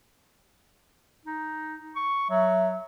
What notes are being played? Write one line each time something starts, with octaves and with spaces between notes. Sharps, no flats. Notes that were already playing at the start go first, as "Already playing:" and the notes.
D#4
C#6
F#3 E5